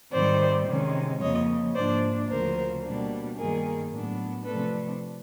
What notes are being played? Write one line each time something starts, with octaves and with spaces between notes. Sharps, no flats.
G#2 D#3 G3 C4 C5 D5
C3 D#3 G#3 C#4
F2 C#3 F3 A#3 C#5 D#5
G#2 F3 A#3 D4 C5 D5
D2 C#3 F3 A#4 C5
B2 G3 A#3 D4
G2 D#3 G3 A#3 G#4 A#4
A2 F#3 B3 D4
C3 F3 A3 D4 A4 B4